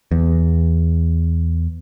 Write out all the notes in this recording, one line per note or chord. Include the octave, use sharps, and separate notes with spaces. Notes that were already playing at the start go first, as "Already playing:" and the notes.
E2